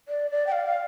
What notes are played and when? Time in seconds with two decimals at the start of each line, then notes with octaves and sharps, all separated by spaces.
0.08 D5
0.31 D5
0.47 G5
0.52 F5
0.66 F5